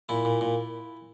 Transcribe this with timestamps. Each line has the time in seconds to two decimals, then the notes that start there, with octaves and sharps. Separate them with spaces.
0.09 A#2 E4
0.25 A#2
0.41 A#2